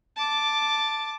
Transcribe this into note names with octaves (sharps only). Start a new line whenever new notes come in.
A5 D6